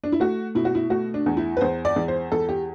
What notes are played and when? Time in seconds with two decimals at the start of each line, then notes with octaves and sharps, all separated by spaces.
0.04 D4
0.12 E4
0.20 A3 F#4
0.55 B2 E4
0.65 F#4
0.75 E4
0.90 A3 F#4
1.14 D4
1.26 E2
1.37 E4
1.57 B4
1.61 E2 C5
1.85 D5
1.96 E2
2.08 C5
2.32 E2 A4
2.49 G4